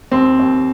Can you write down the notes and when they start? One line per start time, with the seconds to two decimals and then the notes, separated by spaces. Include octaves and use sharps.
0.11 D#2 C4
0.39 D#2